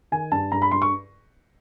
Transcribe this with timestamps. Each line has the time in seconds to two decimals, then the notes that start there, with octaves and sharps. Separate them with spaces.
0.12 D#3 G#5
0.32 G2 A5
0.52 G2 A#5
0.62 B5
0.71 G2 C6
0.82 C#6